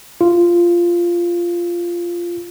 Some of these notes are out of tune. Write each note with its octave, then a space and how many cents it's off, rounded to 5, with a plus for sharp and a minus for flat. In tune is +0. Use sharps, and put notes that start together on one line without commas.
F4 -10